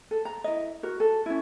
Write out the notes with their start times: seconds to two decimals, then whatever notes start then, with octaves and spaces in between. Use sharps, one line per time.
0.11 A4
0.25 A#5
0.44 E4 D#5
0.83 F#4 A#4
1.00 A4
1.26 C#4 E4